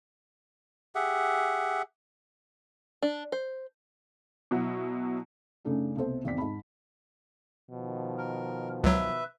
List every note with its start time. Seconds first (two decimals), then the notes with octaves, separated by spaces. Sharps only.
0.95 G4 G#4 E5 F#5
3.02 D4
3.32 C5
4.51 B2 F#3 E4 F#4
5.65 F#2 C#3 A3 D4 D#4
5.96 C2 B2 A4 C5
6.25 G#1 E2 C4 D5 B6
6.38 G#2 A5 B5
7.69 B2 D#3 F3
8.18 A#4
8.84 C#2 F#3 B4 E5